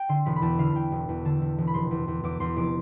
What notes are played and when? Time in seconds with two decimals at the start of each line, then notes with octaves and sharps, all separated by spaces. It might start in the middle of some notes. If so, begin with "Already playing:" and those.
Already playing: G5
0.09 D3 C6
0.26 E1 B5
0.36 B5
0.42 E2 A5
0.58 D3 F5
0.75 E2 G5
0.92 E1
1.09 E2
1.25 D3 A5
1.41 E1
1.58 E1
1.67 B5
1.74 F1 C6
1.91 E2
2.08 E2
2.24 E2 D6
2.40 E2 C6
2.56 F1 D6